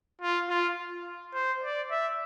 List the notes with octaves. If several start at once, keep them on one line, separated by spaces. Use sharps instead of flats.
F4
F4
C5
D5
E5